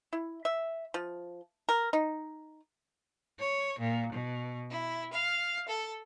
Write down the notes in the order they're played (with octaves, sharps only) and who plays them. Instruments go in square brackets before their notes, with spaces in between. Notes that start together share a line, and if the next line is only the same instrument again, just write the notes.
[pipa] E4
E5
F3
A#4
D#4
[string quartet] C#5
A#2
B2
E4
F5
A4